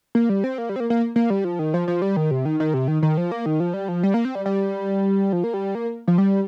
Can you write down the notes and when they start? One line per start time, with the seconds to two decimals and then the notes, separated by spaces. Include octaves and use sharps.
0.15 A#3
0.29 G3
0.44 C4
0.58 A#3
0.69 G3
0.76 C4
0.80 A#3
0.90 A#3
1.16 A#3
1.30 G3
1.44 F3
1.59 D#3
1.74 F3
1.88 F3
2.02 G3
2.17 D#3
2.31 C3
2.45 D#3
2.60 D#3
2.74 C3
2.88 D#3
3.03 D#3
3.17 F3
3.32 A#3
3.46 D#3
3.60 F3
3.74 G3
3.88 F3
4.03 G3
4.14 A#3
4.25 C4
4.35 G3
4.46 G3
5.33 F3
5.44 A#3
5.54 G3
5.75 A#3
6.08 F3
6.18 G3